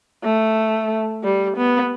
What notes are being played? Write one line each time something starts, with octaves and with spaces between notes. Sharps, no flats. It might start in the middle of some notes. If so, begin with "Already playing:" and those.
A3
G3
B3